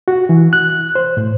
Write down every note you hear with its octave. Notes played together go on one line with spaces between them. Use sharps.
F#4
E3
F#6
C5
A2